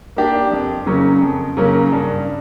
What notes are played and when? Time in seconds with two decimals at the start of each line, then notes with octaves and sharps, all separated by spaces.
0.16 A#3 D4 G4
0.51 F2
0.86 C#3 F#3 A#3 C#4
1.22 F2
1.57 C#3 F#3 A#3 C#4
1.92 G2